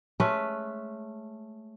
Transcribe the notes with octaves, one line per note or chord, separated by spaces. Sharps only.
G#3 A3 C#4 B4